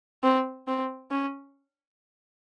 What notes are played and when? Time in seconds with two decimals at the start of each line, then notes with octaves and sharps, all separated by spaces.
0.23 C4
0.67 C4
1.11 C#4